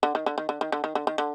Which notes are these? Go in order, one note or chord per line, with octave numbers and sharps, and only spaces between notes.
D3
D#3
D3
D#3
D3
D#3
D3
D#3
D3
D#3
D3